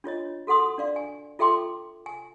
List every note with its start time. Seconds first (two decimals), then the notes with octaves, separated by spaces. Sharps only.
0.04 D4 F4 C#5 D#5
0.47 F#4 A4 F#5 C6 D#6
0.78 D4 D5 F5
0.96 G#5
1.39 F4 A4 E5 G5 C6 D6
2.06 G#5